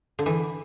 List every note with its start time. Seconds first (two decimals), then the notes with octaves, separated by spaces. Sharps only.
0.19 D3
0.26 E3